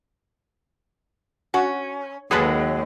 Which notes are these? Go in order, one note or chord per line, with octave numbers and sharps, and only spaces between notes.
C#4 F#4
D#2 F#3 G#3 G#4 A4 B4